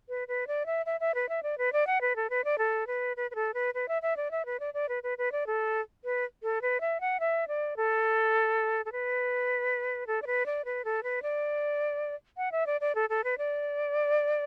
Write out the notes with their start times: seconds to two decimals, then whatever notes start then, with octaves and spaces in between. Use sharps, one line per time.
0.09 B4
0.28 B4
0.47 D5
0.66 E5
0.86 E5
1.00 E5
1.15 B4
1.29 E5
1.43 D5
1.58 B4
1.73 D5
1.87 F#5
2.01 B4
2.16 A4
2.30 B4
2.45 D5
2.58 A4
2.87 B4
3.17 B4
3.31 B4
3.35 A4
3.54 B4
3.74 B4
3.88 E5
4.02 E5
4.17 D5
4.31 E5
4.46 B4
4.60 D5
4.74 D5
4.89 B4
5.03 B4
5.18 B4
5.32 D5
5.47 A4
6.04 B4
6.43 A4
6.62 B4
6.81 E5
7.01 F#5
7.20 E5
7.48 D5
7.77 A4
8.85 A4
8.92 B4
10.07 A4
10.22 D5
10.27 B4
10.46 D5
10.65 B4
10.85 A4
11.03 B4
11.23 D5
12.37 F#5
12.52 E5
12.66 D5
12.81 D5
12.95 A4
13.10 A4
13.24 B4
13.38 D5